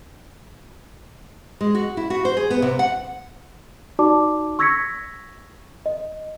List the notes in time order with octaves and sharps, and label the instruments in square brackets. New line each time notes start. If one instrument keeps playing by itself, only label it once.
[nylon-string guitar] G#3
F#4
E4
F#4
C5
G#4
B3
C3
F#5
[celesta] D#4 F#4 D5 A5 D6
C#6 E6 G#6 A#6 B6 C#7
D#5